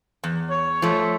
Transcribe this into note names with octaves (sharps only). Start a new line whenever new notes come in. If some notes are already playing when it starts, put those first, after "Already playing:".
E2
C#5
F3 A3